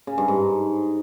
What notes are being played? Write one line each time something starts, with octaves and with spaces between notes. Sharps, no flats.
C#3
G2
G#2